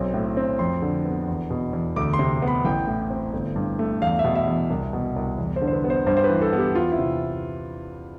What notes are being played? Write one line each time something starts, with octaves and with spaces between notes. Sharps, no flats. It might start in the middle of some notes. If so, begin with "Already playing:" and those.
Already playing: B1 C4
A2
C4
F2 C6
D3
B3
E2
B2
E2
D2 D6
C6
C3
B3
B5
A1 G5
A2
C4
G1
G2
A3
E2 F5
E5
B2
E5
E2
C2
B2
C2
E2
C5
D3
C5
B4
B3
C5
G2 C5
C5
B4
E3
A4
B3
G4
E2 F4
E4
C3